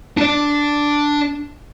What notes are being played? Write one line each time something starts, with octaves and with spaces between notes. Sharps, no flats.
D4 D5